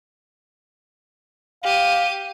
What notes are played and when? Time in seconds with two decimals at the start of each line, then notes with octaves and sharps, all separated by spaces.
1.64 G4 F5 D#7